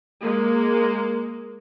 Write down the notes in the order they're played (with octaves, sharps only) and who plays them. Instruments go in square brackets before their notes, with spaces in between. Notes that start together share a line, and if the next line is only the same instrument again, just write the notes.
[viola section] G#3 A#3